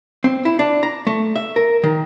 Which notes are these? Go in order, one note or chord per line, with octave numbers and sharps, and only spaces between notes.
C4
E4
D4
A#5
A3
E5
A#4
D#3